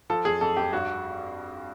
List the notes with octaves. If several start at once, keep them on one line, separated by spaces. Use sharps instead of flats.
F3 A4
F2 G#4
F2 A4
F2 G4
G2 F#4